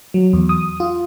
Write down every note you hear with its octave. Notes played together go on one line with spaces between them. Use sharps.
F#3
E2
D#6
F4